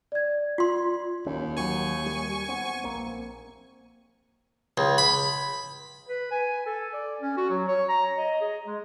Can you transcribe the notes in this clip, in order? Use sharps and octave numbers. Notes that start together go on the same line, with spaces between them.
D5 G#6
F4 C6
D1 D#2 C#4
D#3 F#3 G#5 C#6
G3
B3 C4
A#1 A#3 C4
C#2
B5
B4
G#5
A4
D5
C#4
F#4
F#3
C#5
A#5
D#5
G#4
G#3